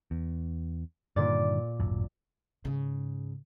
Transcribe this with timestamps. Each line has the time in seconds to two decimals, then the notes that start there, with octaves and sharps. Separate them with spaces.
0.11 E2
1.16 G2 A#2 D3 D#3 D5
1.80 D1 G#1 F#2
2.65 G#2 C#3